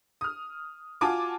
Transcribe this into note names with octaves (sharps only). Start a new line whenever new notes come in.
D#6 F6
F4 F#4 G#5 A5 D6